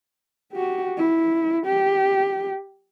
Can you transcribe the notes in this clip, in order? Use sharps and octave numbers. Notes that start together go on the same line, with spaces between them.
F#4 G4
E4
G4